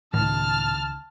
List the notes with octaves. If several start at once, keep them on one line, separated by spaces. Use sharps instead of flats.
C#2 A2 D#3 A5 F6